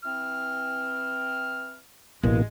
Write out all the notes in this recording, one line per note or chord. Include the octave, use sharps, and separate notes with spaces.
E3 C4 F6
A1 B2 E3 G#3 A#3